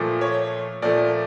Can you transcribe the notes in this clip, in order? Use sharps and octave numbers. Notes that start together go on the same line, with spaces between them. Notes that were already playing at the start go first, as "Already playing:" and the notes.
Already playing: A#2 F3 A3
C#5
A#2 F3 A3 D5